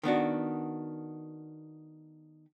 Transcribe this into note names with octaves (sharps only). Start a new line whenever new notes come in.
D#3 B3 D4 F#4